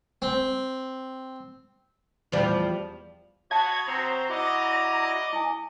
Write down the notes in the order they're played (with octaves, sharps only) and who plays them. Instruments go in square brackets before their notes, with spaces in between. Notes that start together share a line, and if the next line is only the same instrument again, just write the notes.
[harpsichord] C4
[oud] E2 F3 G3
[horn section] F#4 [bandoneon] C#5 B5 D#6 [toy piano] F5 A5 [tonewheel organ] G#6
[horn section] C4 F#4 C5 [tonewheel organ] A#5
[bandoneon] E4 F#4 [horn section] D5 D#5
[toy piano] E4 G#5